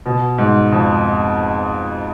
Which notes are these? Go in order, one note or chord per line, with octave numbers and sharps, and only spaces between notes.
B2
G#2
F2